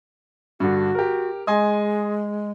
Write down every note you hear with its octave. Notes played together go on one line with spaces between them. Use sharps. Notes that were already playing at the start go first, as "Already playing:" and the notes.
G2 D3 F#4
G4 A#4
G#3 D#5 G#5 C6